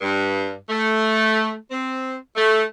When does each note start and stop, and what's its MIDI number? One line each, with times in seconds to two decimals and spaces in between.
0.01 0.54 43
0.69 1.54 57
1.71 2.14 60
2.36 2.63 57